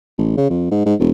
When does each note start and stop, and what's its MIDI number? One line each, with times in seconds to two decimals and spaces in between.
0.18 0.35 33
0.37 0.49 49
0.49 0.70 41
0.71 0.81 44
0.85 0.94 44
1.00 1.11 28